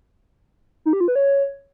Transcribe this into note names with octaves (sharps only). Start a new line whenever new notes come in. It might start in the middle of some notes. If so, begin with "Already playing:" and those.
D#4
G4
F4
B4
C#5